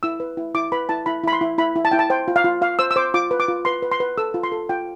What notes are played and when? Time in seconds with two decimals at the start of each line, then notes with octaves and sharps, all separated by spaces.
0.03 E4 E6
0.20 B4
0.37 E4
0.54 E4 D6
0.72 B4 B5
0.89 E4 A5
1.06 E4 B5
1.24 E4 B5
1.33 C6
1.41 E4
1.58 E4 B5
1.76 E4
1.85 A5
1.91 E4 G5
1.99 A5
2.10 C5 G5
2.28 F4
2.36 F5
2.44 F4
2.62 F4 F5
2.79 C5 E6
2.91 E6
2.96 C5 D6
3.14 F4 D6
3.31 B4
3.40 D6
3.48 F4
3.65 B4 C6
3.82 B4
3.92 C6
4.00 B4
4.18 A4 E6
4.34 F4
4.43 C6
4.52 A4
4.69 F4 G5